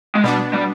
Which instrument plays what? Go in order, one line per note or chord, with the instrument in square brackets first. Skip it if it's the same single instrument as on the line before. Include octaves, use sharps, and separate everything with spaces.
[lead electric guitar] G#3
[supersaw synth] B2 B3 D4 [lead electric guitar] G3
[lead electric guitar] G3